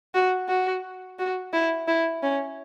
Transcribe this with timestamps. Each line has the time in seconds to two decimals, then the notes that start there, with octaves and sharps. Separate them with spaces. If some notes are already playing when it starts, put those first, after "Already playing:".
0.15 F#4
0.48 F#4
1.19 F#4
1.53 E4
1.88 E4
2.23 C#4